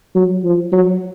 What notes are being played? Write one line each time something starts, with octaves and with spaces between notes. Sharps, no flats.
F#3
F3
F#3